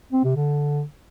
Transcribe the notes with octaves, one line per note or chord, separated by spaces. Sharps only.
C4
C3
D3